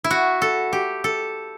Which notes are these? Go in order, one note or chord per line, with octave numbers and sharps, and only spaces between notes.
E4
F#4
A4
G4
A4